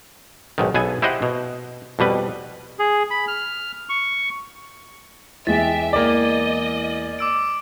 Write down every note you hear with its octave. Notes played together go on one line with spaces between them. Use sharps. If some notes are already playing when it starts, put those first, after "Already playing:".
B1 G#2 D#3
B1 B3 G#4 A4 G#5
E4 G4 C5 D#5 E5 F#5
B2
F2 B2 G3 B4
G#4
B5
F6
C#6
E2 G#3 G4 E5 A6
A#3 D5 D#5
D6 E6 D7